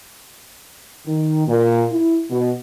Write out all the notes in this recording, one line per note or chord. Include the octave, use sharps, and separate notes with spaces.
D#3
A#2
E4
B2